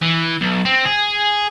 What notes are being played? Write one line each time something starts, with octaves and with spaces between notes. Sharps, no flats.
E3
B1
C4
G#4